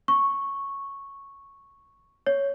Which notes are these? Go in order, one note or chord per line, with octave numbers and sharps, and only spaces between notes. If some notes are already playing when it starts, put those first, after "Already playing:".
C#6
C#5